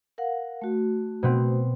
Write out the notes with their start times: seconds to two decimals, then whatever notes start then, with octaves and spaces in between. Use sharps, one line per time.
0.18 A#4 F5 F#5
0.62 A3 F#4
1.23 B2 B3 C4